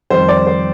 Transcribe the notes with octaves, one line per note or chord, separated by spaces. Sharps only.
F2 D#3 G3 C5
D5
C5